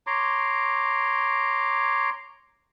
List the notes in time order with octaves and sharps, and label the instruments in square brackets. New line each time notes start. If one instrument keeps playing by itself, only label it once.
[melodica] C#5 A#5 C6 D6